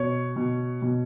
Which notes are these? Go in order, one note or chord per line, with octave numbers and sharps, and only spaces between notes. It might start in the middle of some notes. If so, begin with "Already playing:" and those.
Already playing: B2 C#5
B2
B2